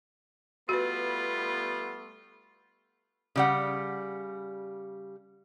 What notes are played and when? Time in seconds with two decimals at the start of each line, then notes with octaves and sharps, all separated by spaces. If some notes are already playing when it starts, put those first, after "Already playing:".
0.69 G3 A3 B3 F4 F#4 B4
3.36 C#3 G3 F#5